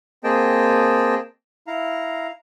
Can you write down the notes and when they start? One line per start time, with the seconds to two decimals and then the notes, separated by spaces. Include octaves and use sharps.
0.24 A#3 C4 G#4 D#5 G5 A5
1.67 E4 F5 A#5